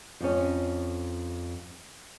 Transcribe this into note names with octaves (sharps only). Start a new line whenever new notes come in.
F2 C#4